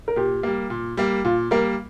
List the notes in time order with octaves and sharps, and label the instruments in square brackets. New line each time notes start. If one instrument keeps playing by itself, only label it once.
[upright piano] A#4
[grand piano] A#2 [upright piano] G4
[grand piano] G3 A#3
A#2
G3 A#3
[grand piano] A#2 [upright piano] F4
[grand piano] G3 A#3 [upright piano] A#4